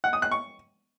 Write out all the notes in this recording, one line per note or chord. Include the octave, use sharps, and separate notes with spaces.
F#5
D#6
F#6
C#6